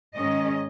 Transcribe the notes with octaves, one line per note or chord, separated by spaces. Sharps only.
G#2 D#3 G#3 C#4 D#5